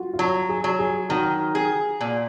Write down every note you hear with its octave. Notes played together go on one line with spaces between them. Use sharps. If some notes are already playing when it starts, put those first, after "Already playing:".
Already playing: F4 F#4
F4
F#3 F#4
G#4
F#3
G#4
D#3 F#4
G#4
A#2